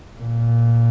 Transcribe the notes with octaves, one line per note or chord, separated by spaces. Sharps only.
A#2